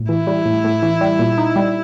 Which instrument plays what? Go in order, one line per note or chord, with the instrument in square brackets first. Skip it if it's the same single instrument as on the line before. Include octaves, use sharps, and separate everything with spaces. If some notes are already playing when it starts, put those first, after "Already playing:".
Already playing: [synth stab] A2
[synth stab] E3 [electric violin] E4
[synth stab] G3
A2
A2
E3
G3
A#2
D#4
G3